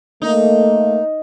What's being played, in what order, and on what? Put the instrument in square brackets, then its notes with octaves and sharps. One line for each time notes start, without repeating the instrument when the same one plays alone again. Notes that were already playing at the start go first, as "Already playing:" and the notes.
[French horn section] A3 A#3 [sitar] D#4